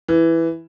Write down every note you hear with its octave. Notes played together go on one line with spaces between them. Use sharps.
E3